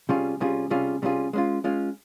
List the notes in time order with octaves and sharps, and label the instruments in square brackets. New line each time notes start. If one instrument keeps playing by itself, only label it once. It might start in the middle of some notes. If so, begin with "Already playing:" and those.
[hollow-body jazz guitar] C3 G3 C#4 F4 G#4
C3 G3 C#4 F4 G#4
C3 G3 C#4 F4 G#4
C3 G3 C#4 F4 G#4
G#3 C#4 F4
G#3 C#4 F4